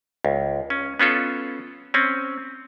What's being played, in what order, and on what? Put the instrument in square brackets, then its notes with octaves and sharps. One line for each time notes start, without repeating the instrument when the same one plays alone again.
[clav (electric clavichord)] C#2
C#4
B3 C#4 F4 A4
C4 C#4